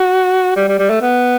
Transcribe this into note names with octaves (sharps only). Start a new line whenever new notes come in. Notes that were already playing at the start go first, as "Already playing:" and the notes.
Already playing: F#4
G3
G3
G3
A3
B3